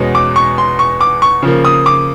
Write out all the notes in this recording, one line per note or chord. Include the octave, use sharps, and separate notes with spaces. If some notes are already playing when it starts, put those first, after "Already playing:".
Already playing: E2 B2 G#3 C#4
D6
C#6
C6
C#6
D6
C#6
C#3 F3 A#3
D#6
D6